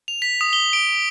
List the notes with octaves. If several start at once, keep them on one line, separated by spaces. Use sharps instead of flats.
F7
B6
D#6
G7
D7